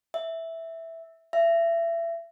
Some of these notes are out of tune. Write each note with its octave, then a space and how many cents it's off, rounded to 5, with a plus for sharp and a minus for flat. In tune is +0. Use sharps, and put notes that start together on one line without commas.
E5 -5
E5 +30